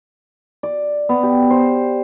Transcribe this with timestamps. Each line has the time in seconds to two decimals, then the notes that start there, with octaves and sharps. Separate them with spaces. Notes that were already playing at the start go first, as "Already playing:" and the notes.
0.63 D5
1.09 B3
1.23 G4
1.51 C5